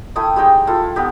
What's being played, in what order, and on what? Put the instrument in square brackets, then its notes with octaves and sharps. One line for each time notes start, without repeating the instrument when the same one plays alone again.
[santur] A3 E4 G5 D#6
G3 G#3 D#4 G5
E4 F4 A4
B3 D#4 G4